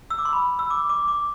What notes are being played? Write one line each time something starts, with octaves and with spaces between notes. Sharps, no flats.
E6
D6
C6
B5
E6
D6
D6
D6